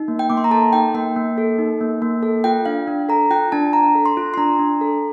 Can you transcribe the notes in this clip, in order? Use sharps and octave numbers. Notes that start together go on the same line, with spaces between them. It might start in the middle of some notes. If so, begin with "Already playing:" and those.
Already playing: D#4
A#3
G5
A#3 D6
C6
A#5
A4 A5
D#4 G5
A#3 G5
A#3
A4
D#4
A#3
A#3
A4
F4 G5
D4 F5
D4
A4 A#5
F4 G5
D4 A5
D4 A#5
A4
C6
F4
C6
D4 A#5
D4
A4